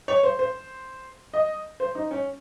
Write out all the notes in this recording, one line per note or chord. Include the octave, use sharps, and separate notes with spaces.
C#5
C5
C5
D#5
C5
D#4
C#4